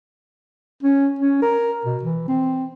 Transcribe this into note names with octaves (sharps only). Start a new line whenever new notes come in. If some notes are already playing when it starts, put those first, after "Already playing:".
C#4
C#4
A#4
B2
E3
C4